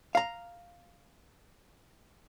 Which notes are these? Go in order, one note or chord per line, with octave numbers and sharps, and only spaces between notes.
F5 A#5